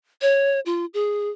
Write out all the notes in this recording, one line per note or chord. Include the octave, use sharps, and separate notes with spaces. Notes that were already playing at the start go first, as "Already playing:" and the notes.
C#5
F4
G#4